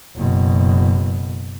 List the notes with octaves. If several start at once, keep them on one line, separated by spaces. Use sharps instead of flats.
F#1 B2